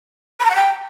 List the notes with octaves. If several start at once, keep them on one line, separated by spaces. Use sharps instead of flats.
B5
A#5
F#5
G5